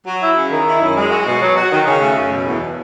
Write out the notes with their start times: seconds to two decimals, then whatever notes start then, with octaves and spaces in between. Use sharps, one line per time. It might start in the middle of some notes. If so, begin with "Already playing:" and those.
0.05 F#3
0.21 E4
0.36 C#3
0.51 D#3
0.66 E4
0.81 F#2
0.96 G#3
1.11 F#4
1.26 B2
1.42 F#3
1.57 F#4
1.71 D#3
1.86 C#3
2.01 A3
2.16 F#2
2.32 B2
2.46 E2